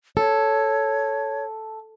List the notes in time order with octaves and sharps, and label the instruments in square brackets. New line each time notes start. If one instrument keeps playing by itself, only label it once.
[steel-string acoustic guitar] A4 [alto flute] C#5